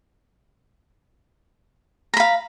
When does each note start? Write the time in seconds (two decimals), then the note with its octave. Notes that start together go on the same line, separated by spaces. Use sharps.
2.14 A#5
2.17 B5
2.20 F5